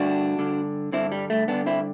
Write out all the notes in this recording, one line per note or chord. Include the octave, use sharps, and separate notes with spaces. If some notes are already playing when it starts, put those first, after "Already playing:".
Already playing: G2 D3 D4 F#4
G2 D3
G2 D3 C4 E4
G3
A3
G2 D3 B3 D4
C4 E4